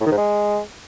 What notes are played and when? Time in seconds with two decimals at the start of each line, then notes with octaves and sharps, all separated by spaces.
0.01 A2
0.06 D#3
0.12 G#2
0.17 G#3